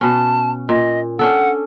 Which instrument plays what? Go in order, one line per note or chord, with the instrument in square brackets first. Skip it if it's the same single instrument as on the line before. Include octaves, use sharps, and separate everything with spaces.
[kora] B2 C#4 [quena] A5
[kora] A#2 [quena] D#5
[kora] C#4 D4 A4 [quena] F#5